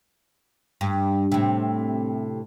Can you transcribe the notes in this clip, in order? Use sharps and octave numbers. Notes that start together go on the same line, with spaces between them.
G2
A2 C3